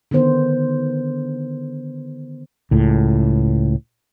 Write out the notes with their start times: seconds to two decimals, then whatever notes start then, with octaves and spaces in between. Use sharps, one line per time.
0.11 D3 D#3 B3 C5
2.71 C#2 A2